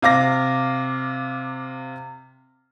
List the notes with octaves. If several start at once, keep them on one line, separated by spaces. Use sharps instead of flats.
C3 F5 D6 A#6